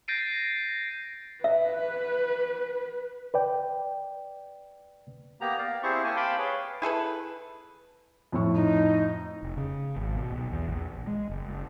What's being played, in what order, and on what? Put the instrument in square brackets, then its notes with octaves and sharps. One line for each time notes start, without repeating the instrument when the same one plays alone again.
[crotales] G6 A6 A#6 C7 D7 D#7
[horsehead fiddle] B4 [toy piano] E5
[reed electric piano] B4 D5 G5
[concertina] A#3 B3 G4 A#5
D5 F5
C4 E4 G4 G#4 C5 C#6
A#3 G4 G#5 A5
F5 G5 A5 B5 C6 D6
G#4 B4 C#5
[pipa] E4 G#4 A4 B4
[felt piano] F2 A2 C#6
[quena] D#4
[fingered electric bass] F1
C#3
G#1
B2
B1
E2
A#1
G#3
F#1